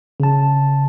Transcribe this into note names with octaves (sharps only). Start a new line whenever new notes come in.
C#3 A5